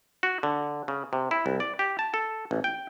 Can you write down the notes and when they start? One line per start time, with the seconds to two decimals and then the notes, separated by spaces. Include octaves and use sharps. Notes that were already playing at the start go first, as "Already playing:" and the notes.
0.23 F#4
0.43 D3
0.88 C#3
1.13 C3
1.31 E4
1.46 C2
1.60 D5
1.79 G4
1.99 A5
2.14 A4
2.51 A1
2.64 G5